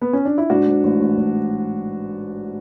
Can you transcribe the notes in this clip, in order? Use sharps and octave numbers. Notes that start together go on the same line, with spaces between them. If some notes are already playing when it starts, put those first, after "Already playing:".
B3
C#4
D4
E4
G#2 D4 F#4
G#2
A1
A1
A1